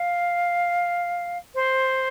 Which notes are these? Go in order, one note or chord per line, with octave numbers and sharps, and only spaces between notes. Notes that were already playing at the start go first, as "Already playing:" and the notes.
Already playing: F5
C5